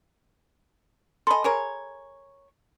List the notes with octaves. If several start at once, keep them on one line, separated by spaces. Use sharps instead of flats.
A4 D#5 G#5 B5 C6
G#4 A#4 C#5